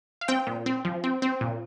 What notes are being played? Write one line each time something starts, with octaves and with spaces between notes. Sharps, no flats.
F5
C4 G5
A#2
C4
F3
C4
C4
A#2